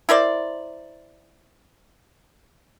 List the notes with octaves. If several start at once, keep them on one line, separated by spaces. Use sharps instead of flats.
E4 A#4 C5 D5